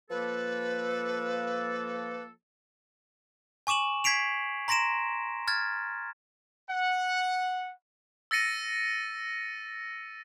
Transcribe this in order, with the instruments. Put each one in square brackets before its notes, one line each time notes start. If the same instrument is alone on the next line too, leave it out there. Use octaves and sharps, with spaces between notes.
[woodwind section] F3 A#3 A4 [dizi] B4
[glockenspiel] G#5 C#6 D6 E7 F#7
G#6 B6 C7 D7 F7
A#5 C6 A#6 D7 E7
F6 G#6 A6
[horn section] F#5
[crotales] E6 A6 A#6 C#7 D#7